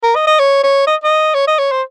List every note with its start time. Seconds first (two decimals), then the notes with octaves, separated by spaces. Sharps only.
0.03 A#4
0.15 D#5
0.27 D#5
0.39 C#5
0.63 C#5
0.87 D#5
1.04 D#5
1.34 C#5
1.47 D#5
1.59 C#5
1.71 C5